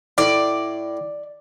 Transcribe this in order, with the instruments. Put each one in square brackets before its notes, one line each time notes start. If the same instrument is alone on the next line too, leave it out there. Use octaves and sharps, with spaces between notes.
[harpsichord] A2 [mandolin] D5